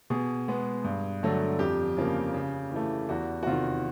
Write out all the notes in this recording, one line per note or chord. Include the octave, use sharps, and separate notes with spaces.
B2 G#4
G#3 B3
G2
D3 F#3 A3
F2 G4
C#3 F3 A#3
C#3
E3 A3
E2 F#4
F#4
C3 D#3 F4